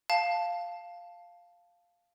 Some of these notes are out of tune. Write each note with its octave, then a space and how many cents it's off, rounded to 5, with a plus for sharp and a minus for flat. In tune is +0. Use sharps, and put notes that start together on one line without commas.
F5 +0 A5 +0